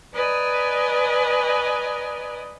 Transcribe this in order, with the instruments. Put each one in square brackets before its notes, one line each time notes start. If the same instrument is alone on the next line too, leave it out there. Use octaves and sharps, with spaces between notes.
[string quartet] B4 D5 D#5 G#5 A#5